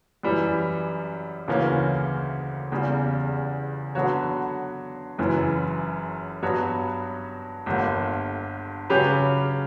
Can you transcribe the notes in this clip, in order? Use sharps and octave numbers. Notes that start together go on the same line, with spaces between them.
F#2 E3 G3
D2 C#3 E3 A#3 C#4
E2 C#3 G3
D3 F#3 B3 F#4 C#5
F#1 F#2 E3
G2 F#3 B3 F#4 C#5
G1 G2 D3 A#3
C#3 F#3 C#4 G4 B4